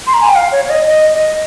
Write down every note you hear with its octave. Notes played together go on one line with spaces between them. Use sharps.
C6
A#5
G#5
G5
F5
C#5
C#5
D#5
D#5
D#5